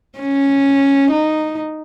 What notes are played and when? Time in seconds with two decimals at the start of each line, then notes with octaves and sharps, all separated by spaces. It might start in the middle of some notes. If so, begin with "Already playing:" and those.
0.19 C#4
1.10 D#4